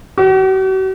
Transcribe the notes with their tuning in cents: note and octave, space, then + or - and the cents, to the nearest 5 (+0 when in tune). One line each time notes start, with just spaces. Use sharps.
F#4 +45